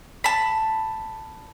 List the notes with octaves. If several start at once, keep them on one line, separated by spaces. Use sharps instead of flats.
A5 B5